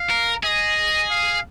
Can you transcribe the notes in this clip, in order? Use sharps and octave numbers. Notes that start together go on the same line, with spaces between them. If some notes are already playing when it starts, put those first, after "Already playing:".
Already playing: F5
A#4
G#4 D#5
F5